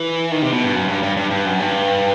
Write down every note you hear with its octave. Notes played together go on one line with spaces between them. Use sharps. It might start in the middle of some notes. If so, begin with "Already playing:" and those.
Already playing: E3
D#3
C3
B2
G2
F#2
G2
G2
G2
G2
F#2
G2